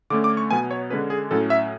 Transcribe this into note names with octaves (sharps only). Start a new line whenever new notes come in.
D3 A3 C#4 D6
D6
C#6
B2 F#3 B3 G#5
C#5
D3 G#3 C#4 B4
G#4
A2 F#3 C#4 A4
E5